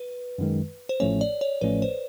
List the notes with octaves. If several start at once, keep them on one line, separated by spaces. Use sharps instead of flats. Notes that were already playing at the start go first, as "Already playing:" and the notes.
Already playing: B4
F#2 D#3 G#3
C5
A1 A2 F3 A3 C#4 C#5
D5
C#5
A1 A2 F3 A3 C#4 B4
C5